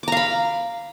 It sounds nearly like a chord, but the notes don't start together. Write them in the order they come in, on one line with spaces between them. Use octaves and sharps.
D6 A#5 F5 B5